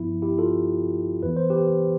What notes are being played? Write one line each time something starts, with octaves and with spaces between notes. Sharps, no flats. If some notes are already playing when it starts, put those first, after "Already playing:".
Already playing: G2 F3 B3 E4
E4 G4
F4 A4
F2 E3 B3 B4
C5
G4 B4